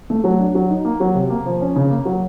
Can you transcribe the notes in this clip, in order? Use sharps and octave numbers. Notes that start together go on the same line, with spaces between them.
A3
F#3
D4
F#3
D#4
A#3
F#3
C3
A#3
F3
C#4
C#3
A#3
F#3